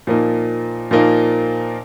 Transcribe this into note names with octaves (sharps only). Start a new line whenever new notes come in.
A#2 F3 A#3 D#4
A#2 F3 A#3 D#4